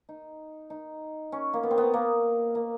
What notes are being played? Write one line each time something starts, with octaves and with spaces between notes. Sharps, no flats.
D#4
D#4
C#4
A#3
B3
C4
B3
A#3
A#3